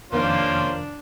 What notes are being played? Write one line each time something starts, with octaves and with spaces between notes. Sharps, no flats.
F2 C3 D#3 A#3 C#4 D4 F4 C5